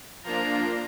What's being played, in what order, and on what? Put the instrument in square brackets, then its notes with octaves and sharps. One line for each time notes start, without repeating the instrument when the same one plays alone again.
[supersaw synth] F3 A#3 D4 [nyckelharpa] F4 A#5